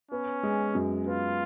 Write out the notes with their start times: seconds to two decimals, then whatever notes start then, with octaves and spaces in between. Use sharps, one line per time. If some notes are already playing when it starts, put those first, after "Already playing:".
0.11 B3 C#4
0.43 G#3
0.75 F#2
1.06 B3 F4